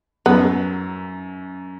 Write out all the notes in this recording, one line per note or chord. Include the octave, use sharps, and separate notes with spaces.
F#2 F#3 B3